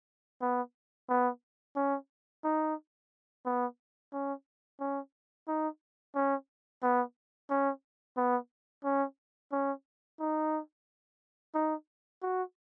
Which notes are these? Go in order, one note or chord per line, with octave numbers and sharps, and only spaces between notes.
B3
B3
C#4
D#4
B3
C#4
C#4
D#4
C#4
B3
C#4
B3
C#4
C#4
D#4
D#4
F#4